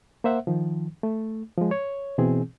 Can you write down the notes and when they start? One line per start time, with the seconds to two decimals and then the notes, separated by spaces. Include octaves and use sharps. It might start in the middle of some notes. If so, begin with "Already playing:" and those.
0.24 A#3 C5 E5 F#5
0.47 D#3 F3
1.03 A3
1.57 F3 G#3
1.71 C#5
2.18 B2 E3 C4 G#4